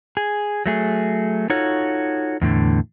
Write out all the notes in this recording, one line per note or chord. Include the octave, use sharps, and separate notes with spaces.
G#4
F#3 A3 G#4
D#4 F4 F#4 A4 C#5
E2 A2 D3